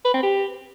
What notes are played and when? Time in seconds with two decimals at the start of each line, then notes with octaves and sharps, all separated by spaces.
0.05 B4
0.14 C4
0.23 G4